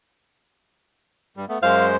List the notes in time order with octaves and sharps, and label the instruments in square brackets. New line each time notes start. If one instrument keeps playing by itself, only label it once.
[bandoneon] G2 G3
A3 B3
[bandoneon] F#2 G#3 C5 [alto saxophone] F5